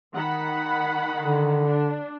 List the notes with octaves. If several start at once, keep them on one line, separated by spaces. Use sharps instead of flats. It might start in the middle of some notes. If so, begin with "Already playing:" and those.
D#3 F#5 B5
D3
D4